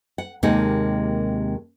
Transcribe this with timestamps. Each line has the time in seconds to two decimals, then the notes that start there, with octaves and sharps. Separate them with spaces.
0.18 F#5
0.43 D#2 C3 G#3 A#3 D#4 F#5